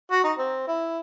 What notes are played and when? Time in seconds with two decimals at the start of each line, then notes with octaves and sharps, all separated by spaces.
0.11 F#4
0.24 D#4
0.38 C4
0.68 E4